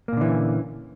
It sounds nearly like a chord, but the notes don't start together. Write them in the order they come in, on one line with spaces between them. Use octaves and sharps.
A#3 A#2 D3 E3 C#4